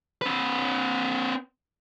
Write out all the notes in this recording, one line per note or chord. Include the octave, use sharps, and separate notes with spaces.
C4 B4